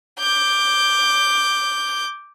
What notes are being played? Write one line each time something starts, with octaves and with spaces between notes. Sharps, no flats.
D6 G6